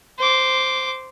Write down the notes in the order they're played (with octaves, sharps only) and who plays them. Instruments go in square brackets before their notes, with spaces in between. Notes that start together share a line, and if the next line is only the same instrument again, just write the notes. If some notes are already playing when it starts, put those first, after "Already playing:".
[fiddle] C5 D6